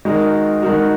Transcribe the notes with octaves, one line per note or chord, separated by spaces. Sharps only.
D#3 G#3 D#4 F#4 A#4
D#3 G#3 D#4 F#4 A#4